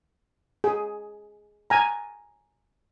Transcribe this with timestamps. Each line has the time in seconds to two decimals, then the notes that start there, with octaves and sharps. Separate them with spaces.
0.64 G#4
1.70 G#5 A#5